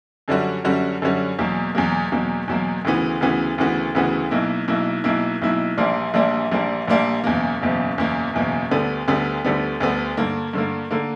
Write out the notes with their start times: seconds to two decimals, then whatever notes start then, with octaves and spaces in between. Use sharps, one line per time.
0.28 F#2 D3 G3 C#4 F#4
0.64 F#2 D3 G3 C#4 F#4
1.02 F#2 D3 G3 C#4 F#4
1.38 E2 B2 F#3 A#3
1.75 E2 B2 F#3 A#3
2.12 E2 B2 F#3 A#3
2.48 E2 B2 F#3 A#3
2.85 D2 C#3 E3 B3 F#4
3.21 D2 C#3 E3 B3 F#4
3.58 D2 C#3 E3 B3 F#4
3.95 D2 C#3 E3 B3 F#4
4.31 B1 B2 A#3 E4
4.68 B1 B2 A#3 E4
5.04 B1 B2 A#3 E4
5.42 B1 B2 A#3 E4
5.77 A#1 A#2 G3 A#3 D4
6.14 A#1 A#2 G3 A#3 D4
6.52 A#1 A#2 G3 A#3 D4
6.88 A#1 A#2 G3 A#3 D4
7.24 F#1 E2 B2 A#3
7.61 F#1 E2 B2 A#3
7.98 F#1 E2 B2 A#3
8.34 F#1 E2 B2 A#3
8.71 D2 D3 G3 B3
9.08 D2 D3 G3 B3
9.44 D2 D3 G3 B3
9.80 D2 D3 G3 B3
10.17 G2 D3 A#3
10.53 G2 D3 A#3
10.91 D3 A#3